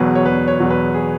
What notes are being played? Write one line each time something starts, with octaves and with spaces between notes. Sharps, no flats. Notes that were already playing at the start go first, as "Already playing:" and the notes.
Already playing: E1 E2 B2 F#3 B4
C#5
E1 B4
C#5
E2 B2 F#3
B4
G#4